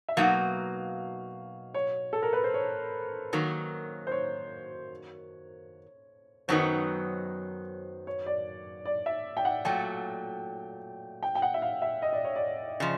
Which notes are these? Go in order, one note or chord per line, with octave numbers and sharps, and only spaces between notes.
E5
B2 F#3 A#3 D#4 F#4 F5
C#5
A4
A#4
B4
C5
C#5
F#2 D#3 F#3 A#3
C5
C#5
F#2 D#3 F#3 B3 D#4 C5
C#5
D5
D5
E5
G5
F#5
A#2 F#3 A3 G5
G5
G5
F#5
E5
F5
E5
D#5
D5
C#5
D5
C#3 F3